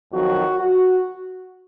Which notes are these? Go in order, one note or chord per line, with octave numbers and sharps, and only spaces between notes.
F2 D#3 F#3 F#4
F#4